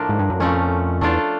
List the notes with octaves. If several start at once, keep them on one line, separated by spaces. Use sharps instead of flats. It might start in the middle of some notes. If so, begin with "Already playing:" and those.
Already playing: A2 F3 A#3 D4
G#2
G2
F#2
F2 A#2 F3 A3 C#4
E2 A3 D4 F4 A4